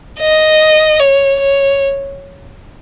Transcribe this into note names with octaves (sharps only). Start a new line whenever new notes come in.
D#5
C#5
C#5